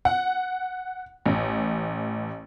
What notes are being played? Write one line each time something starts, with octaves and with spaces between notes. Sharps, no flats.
F#5
A1